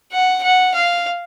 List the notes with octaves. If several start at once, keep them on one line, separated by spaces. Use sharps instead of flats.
F#5
F#5
F5